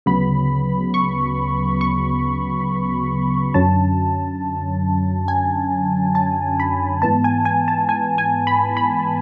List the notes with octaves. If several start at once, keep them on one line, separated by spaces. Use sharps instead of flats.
D2 C#3 F#3 B3 B5
C#6
C#6
F#2 D3 F#3 C#4 A5
G#5
A5
B5
G#2 E3 B3 A5
G#5
G#5
A5
G#5
G#5
B5
B5